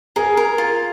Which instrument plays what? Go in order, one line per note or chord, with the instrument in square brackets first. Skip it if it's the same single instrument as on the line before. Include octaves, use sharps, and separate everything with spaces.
[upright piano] G#4 [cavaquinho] A#4
[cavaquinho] A#4
F4